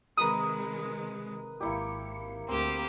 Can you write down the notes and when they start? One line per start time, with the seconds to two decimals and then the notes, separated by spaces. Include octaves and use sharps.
0.17 C3 D#3 G#3 A#4 B4 B5 D#6
1.61 G#1 A#3 E4 G4 C#7
2.48 D2 A#3 C4 G4